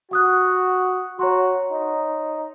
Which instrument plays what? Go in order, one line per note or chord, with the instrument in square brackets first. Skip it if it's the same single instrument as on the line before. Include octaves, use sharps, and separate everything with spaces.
[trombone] F#4 [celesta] F#5 D#6 F#6
[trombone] F#4 [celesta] C#5 A#5 C6
[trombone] D#4